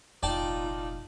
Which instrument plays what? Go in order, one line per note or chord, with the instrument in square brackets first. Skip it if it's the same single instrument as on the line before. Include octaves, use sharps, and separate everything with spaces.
[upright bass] F1 A#1 [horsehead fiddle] D#4 F4 [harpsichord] D5 G5 A5